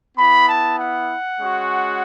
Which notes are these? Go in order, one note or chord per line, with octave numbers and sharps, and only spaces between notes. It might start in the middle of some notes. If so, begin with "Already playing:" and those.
B3 E4 B5
A5
F#5
G#3 C#4 F#4